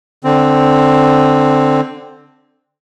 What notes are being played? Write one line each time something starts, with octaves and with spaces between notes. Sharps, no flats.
D3 C4